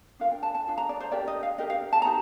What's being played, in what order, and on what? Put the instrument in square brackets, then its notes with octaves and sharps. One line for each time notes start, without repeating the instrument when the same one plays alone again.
[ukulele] D4 F4 A#4 F5
G5
A5
A5
D4 F4
A#5
D5
C5
D4 G4 A#4 D5
D#5
F5
D4 G4 A#4 D#5
F5
A5
D#4 G4 A#5